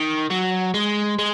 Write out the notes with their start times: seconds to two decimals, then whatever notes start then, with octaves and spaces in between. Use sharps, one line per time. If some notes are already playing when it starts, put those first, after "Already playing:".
Already playing: D#3
0.30 F#3
0.74 G#3
1.19 G#3